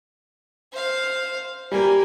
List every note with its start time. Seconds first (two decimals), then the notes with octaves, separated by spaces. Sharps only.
0.72 C5 F5
1.72 G3 A#3 G#5